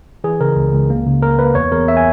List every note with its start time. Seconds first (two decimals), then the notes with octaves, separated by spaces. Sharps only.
0.24 E3 G#4
0.40 C#3 A#4
0.56 C#2
0.73 C#2
0.90 A#3
1.06 C#3
1.22 A#3 A#4
1.39 A#3 B4
1.55 E2 C#5
1.72 E2 A#4
1.88 E5
1.97 G#5